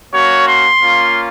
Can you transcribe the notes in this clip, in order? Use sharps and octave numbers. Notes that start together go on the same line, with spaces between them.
A#3 C#4 F#4 C#5
C6
A#3 C#4 F4